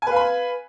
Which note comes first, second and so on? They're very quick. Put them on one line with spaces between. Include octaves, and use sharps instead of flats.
G#5 B4 F5 B5